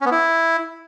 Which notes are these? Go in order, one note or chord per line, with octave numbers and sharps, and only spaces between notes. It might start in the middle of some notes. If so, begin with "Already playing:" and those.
C#4
B3
E4